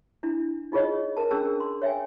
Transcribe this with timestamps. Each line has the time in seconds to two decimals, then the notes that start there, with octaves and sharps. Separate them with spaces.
0.23 D4 E4
0.72 D#4 F4 G#4 C#5 D#5
1.17 A#4 A5
1.31 C#4 D4 G#4 A5 E6
1.60 C6
1.82 C#5 E5 G5 G#5